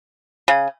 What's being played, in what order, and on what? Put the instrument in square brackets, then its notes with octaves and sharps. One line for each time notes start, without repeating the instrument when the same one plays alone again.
[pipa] C#3